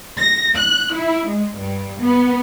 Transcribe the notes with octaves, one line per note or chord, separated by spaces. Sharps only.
A#6
F#6
E4
G#3
G2
B3